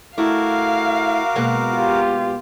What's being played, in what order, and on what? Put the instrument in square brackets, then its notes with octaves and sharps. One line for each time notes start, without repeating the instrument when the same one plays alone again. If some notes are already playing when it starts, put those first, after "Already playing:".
[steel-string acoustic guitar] A3 E4 [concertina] F#4 A#4 D6 [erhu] F5
[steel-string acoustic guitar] B2 G#3 A#3
[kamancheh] F4 G4